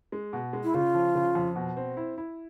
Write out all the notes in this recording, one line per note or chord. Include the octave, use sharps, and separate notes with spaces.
G#3
B2
G#3
E4
C#3 F4
F3
C#3
F2
B2
C4
E4
E4